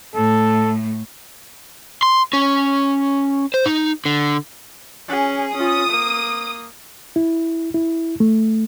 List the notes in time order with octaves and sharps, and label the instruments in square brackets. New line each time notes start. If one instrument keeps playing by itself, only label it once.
[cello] A2 A3 [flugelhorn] A4
[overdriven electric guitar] C6
C#4
C5
D#4
D3
[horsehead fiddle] C#4 G#4
[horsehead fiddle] C#4 F4 [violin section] D#6
[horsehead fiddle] A#3
[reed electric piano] E4
E4
A3